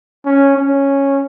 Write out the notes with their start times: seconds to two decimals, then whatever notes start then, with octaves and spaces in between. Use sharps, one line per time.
0.25 C#4
0.56 C#4